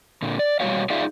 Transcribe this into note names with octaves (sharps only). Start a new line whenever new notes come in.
A#2 D3
D5
B2 G3 A#3 F#4 C#5 F5
D#4 F4 G#4 D5 E5 F5